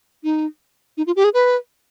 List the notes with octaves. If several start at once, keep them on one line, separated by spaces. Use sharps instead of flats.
D#4
D#4
F4
G4
G#4
B4